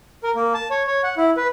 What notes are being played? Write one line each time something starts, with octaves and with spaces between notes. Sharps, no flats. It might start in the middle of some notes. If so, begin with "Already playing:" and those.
A#4
A#3
A5
C#5
C#5
F#5
E4
B4